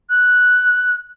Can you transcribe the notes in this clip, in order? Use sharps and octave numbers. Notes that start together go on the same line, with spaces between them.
F#6